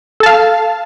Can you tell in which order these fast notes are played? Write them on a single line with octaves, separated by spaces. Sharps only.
A4 A5 F5